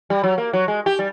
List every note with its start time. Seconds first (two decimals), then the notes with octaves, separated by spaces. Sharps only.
0.10 G3
0.23 F#3
0.38 A#3
0.53 F#3
0.68 G#3
0.86 G4
0.99 G3